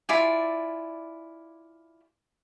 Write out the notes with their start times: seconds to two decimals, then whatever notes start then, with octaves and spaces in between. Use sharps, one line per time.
0.09 E4 F4 D5 G#5